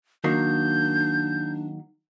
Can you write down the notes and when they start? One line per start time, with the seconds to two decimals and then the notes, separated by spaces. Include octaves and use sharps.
0.24 D#3 F#3 A#3 D4 G6